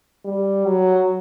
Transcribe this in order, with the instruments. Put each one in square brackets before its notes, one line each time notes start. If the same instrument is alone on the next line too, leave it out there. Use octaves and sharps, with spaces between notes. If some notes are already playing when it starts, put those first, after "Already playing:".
[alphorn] G3
F#3